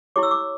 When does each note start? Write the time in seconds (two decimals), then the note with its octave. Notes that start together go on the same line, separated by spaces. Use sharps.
0.16 E4 G4 C#5 D6
0.23 E6
0.31 D6